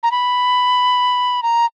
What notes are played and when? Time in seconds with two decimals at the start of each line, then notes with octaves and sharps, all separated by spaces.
0.03 A#5
0.11 B5
1.43 A#5